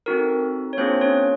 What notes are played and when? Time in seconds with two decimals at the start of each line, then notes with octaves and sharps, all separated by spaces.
0.06 C4 D#4 F#4 A4 A#4
0.73 C#5
0.77 A#3 C4 D4 F4 G#4 C5
1.01 C#4 C#5